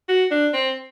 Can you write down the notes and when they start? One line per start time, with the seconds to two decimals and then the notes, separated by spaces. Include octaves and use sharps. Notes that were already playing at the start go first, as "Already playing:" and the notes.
0.09 F#4
0.31 D4
0.54 C4